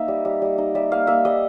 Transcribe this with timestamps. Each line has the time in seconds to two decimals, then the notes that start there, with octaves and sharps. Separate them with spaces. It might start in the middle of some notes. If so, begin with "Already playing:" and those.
Already playing: A#3 D#4 E5
0.08 G3
0.25 G3
0.42 G3
0.58 D#4
0.75 G3 E5
0.91 A#3 F5
1.07 A#3 E5
1.25 G3 D#5